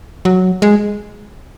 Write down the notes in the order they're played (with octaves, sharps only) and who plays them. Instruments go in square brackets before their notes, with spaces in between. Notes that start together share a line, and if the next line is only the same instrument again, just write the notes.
[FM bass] F#3
G#3